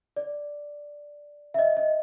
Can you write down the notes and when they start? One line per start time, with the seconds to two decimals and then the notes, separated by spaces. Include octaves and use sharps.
0.16 D5
1.54 E5
1.59 D#5
1.77 D#5